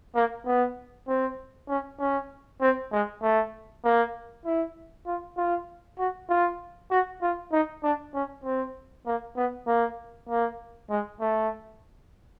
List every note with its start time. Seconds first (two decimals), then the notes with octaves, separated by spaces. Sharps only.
0.15 A#3
0.46 B3
1.08 C4
1.69 C#4
1.99 C#4
2.61 C4
2.92 G#3
3.22 A3
3.84 A#3
4.45 E4
5.06 F4
5.37 F4
5.98 F#4
6.29 F4
6.91 F#4
7.22 F4
7.52 D#4
7.83 D4
8.14 C#4
8.44 C4
9.06 A#3
9.36 B3
9.67 A#3
10.29 A#3
10.90 G#3
11.20 A3